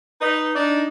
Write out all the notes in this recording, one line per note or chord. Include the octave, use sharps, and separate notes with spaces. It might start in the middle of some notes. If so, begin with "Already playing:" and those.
D#4 B4
D4 D#4